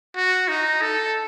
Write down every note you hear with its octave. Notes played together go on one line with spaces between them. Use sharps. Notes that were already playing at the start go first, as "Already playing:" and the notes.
F#4
D#4
A4